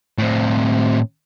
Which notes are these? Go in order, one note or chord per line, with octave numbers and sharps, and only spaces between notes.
A2 C4